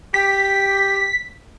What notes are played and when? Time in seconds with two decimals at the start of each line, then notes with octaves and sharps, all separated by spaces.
0.14 G4 B6